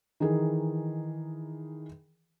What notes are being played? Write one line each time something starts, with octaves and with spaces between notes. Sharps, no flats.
D#3 E3 D#4 G#4 A#4